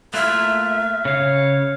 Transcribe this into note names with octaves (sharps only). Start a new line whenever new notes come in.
A3 A#3 F4 E5 F6 F#6
C#3 C#5 F5